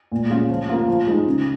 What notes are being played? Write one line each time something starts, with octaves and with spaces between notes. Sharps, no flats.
A#2
G#3 C#4 F4
F3
A#3 F4
F3
G#3 D#4
C#3